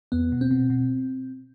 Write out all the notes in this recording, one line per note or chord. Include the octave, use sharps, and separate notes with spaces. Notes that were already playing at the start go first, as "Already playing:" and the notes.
E2 B3
B2
C4
B2
B2